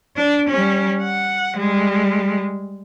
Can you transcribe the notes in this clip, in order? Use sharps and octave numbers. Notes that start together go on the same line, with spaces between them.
D4
G3 C#4
F#5
G3 G#3